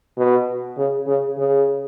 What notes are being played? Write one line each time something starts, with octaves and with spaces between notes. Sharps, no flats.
B2
C#3
C#3
C#3